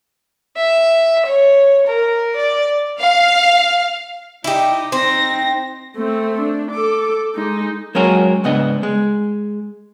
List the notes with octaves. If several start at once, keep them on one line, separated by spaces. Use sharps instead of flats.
E5
C#5
A#4
D5
F5
D#4 E4 G4 D#5
C4 D#4 A#6
A3 C4
D4
A4 D6
G#3 D#4
F#3 G#3 A#3 C#4 F#4 A#4
G#2 C#3 B3 D4 D#5
G#3